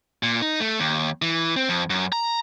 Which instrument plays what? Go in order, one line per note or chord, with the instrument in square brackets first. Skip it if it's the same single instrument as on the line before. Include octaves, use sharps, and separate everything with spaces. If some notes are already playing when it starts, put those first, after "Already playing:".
[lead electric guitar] A#2
D#4
A3
D#2
E3
C4
F2
F#2
A#5